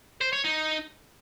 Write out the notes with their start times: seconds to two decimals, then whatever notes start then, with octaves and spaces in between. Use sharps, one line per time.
0.21 C5
0.33 C#5
0.44 D#4